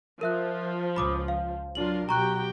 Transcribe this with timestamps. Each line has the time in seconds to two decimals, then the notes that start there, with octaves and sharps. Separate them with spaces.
0.21 F3 A#4 E5 F#6
0.96 C#2 B5 D6 D#6
1.28 F5
1.75 F#3 D4 F4 A#4 F#7
2.09 B2 F#3 F#4 G4 G5 A#5 C#6 F#6